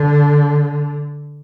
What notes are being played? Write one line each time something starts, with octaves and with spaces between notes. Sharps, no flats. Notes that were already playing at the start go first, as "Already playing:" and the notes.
Already playing: D3